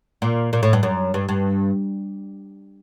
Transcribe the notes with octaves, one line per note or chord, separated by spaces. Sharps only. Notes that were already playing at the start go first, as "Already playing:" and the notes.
A#2
A#2
A2
G2
F#2
G2
G2